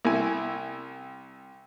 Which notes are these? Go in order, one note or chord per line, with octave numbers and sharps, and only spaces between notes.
C2 E4 G#5